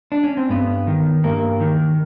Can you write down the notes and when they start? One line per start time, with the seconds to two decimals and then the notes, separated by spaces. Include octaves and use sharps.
0.12 D4
0.24 C#4
0.37 C4
0.49 G2 B3
0.87 D#3
1.24 G2 A#3
1.60 D#3